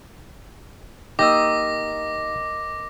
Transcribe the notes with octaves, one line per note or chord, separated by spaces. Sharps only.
A#3 D#4 G4 D#5 D6 E6 A#6